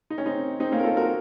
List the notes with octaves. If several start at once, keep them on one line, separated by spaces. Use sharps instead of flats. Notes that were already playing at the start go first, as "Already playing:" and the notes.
D#4
C#4
C4 D#4
C4 D#4
A#3 C#4
A#4
F4 A4
F#4 A#4